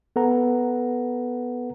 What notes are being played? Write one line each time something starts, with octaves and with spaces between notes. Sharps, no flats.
B3 A4 B4 F#5 A#5